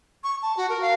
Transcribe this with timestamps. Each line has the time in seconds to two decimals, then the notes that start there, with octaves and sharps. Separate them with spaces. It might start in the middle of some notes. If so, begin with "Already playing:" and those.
0.24 C#6
0.42 A5
0.57 F#4
0.69 A#4
0.81 F5